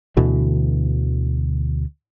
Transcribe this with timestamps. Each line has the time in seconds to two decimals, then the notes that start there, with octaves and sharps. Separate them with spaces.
0.17 D2 B2 D3 E3